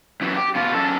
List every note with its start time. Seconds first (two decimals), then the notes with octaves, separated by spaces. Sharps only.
0.21 F#2 E3
0.36 G4
0.55 B2 F4
0.74 F#2 A4